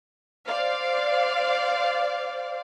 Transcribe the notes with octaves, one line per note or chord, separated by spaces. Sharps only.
C5 D5 F5